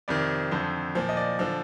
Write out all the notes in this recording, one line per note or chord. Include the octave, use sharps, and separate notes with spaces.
F2 C3 D#3 D5
F2 D3 F3 C5
A#2 F3
D#5
D5
D3 F3